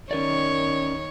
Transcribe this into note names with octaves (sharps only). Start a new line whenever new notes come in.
D#3 C#4 A#4 C#5 D5